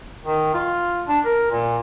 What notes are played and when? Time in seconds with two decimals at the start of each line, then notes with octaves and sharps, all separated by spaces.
0.24 D#3
0.54 F4
1.08 D4
1.25 A#4
1.51 A#2